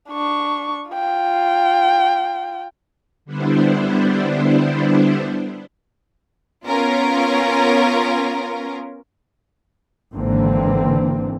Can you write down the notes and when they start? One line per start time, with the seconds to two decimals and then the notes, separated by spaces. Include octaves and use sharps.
0.11 D4 C#6
0.90 F4 G5
3.25 D3 G3 B3 D4 E4 C5
6.66 B3 C#4 F4 A#4
10.13 G#1 D3 E3 A#3 C4